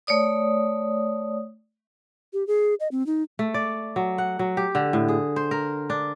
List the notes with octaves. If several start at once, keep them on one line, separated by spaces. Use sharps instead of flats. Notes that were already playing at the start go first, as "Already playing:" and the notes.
A3 C#5 D5 D#6
G4
G#4
D#5
C4
D#4
A3
D5
F#3
F#5
F#3
G4
D3
A2
G#4
C5
A#4
D4